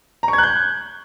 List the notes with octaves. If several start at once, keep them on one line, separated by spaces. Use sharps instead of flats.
A#5
C#6
G#6
F#6
G6